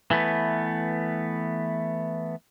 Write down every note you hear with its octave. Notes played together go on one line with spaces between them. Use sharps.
E3 A3 B3